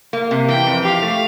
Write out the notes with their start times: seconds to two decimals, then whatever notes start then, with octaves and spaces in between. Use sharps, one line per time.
0.13 A#3
0.31 C3
0.49 E3 G5
0.67 F2
0.85 G4 F5
1.03 A3